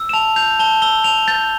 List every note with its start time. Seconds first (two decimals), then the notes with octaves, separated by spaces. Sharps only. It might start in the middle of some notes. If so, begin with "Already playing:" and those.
Already playing: E6
0.09 E7
0.13 A5 F7
0.36 G6 F7
0.59 A5 G7
0.82 E6 G7
1.04 A5 F7
1.28 G6 A6